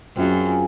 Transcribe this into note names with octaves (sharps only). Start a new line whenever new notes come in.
F#2 C4 F4 G#4